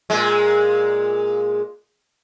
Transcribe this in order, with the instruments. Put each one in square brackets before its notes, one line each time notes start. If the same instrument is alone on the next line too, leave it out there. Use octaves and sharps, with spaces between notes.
[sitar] A#2 G#3